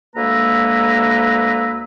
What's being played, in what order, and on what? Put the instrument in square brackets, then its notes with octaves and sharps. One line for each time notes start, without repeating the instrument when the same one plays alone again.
[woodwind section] D2 G#3 A#3 B4 A#5 E6